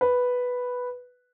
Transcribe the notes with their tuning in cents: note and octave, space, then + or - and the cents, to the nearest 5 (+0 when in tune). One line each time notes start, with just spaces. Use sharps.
B4 +0